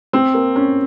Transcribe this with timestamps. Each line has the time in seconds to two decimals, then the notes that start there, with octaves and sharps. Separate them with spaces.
0.13 C4
0.34 A#3
0.56 C#4